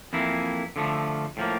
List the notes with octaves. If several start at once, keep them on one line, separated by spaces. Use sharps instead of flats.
F2 E3 A#3 E4
D3 F3 A3
A2 F3 A#3